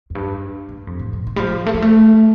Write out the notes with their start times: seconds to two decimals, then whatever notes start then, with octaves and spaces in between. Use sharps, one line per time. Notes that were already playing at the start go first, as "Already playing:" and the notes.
0.10 F2
0.15 G2
0.69 G2
0.87 F2
0.99 A2
1.13 A2
1.27 D#3
1.36 G3
1.40 F3
1.66 A3
1.74 G3
1.82 A3